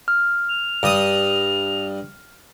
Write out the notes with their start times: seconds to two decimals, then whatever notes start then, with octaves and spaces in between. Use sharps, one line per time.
0.08 F6
0.49 F7
0.83 G2 D#6